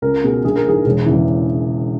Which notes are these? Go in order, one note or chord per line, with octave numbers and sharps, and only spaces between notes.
C#2 A#4
B2 G#4
A#1 G#4
A#4
G#2 E3 G#4
E1 G#4
E2 C#3 E3